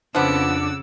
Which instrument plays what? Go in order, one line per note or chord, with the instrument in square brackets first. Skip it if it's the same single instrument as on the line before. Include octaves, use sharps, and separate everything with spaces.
[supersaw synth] F2 F#5 D6 [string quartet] C#3 E6 [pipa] F3 B3 [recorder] D4